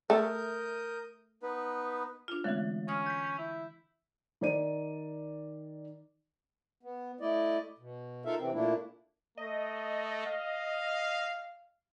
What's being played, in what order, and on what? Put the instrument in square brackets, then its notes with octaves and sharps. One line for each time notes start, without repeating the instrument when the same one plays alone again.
[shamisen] A3 [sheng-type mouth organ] A#4 D#6 G6
[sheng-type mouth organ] B3 D#4 B4
[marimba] D4 F4
[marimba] D3 E3 F#4 [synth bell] G#3 A3 C#5
[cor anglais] C#4 [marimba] D#6 F6
[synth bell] G6 B6
[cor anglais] E4
[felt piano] D#3 D5 D#7
[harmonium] B3
A3 E4 D5 D#5
B2
D#4 F4 A4 A#4 E5 F5
C3 E3 C4
A#2 A3 A#3 D4 E4
[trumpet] A3 [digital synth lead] D#5
[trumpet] F5